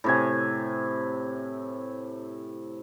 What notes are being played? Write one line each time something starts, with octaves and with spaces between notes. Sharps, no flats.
A2 C3 G#5